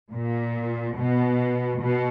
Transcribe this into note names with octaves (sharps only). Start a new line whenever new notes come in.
A#2
B2
B2